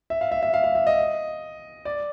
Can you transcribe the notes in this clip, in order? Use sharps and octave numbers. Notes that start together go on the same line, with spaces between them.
E5
F5
E5
E5
F5
F5
E5
D#5
D5